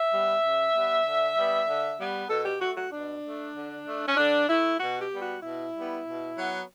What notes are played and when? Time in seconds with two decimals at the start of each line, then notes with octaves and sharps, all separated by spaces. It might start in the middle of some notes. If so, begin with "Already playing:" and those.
Already playing: E5
0.10 G3 B3
0.42 C#3
0.73 G3 B3
1.04 D3
1.35 G3 B3
1.67 D3
1.98 G3 B3
2.29 B2 A4
2.45 G4
2.61 A3 F#4
2.76 F#4
2.92 B2 D4
3.24 A3
3.55 D3
3.86 A3
4.07 C#4
4.17 D3 D4
4.49 A3 E4
4.80 B2 F#4
5.01 G4
5.11 G3 B3
5.22 F#4
5.42 B2 E4
5.74 G3 B3
6.05 B2
6.36 F#3 B3